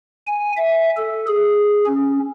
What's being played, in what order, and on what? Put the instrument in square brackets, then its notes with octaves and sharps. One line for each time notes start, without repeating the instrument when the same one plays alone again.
[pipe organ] G#5
E5
A4
G#4
C#4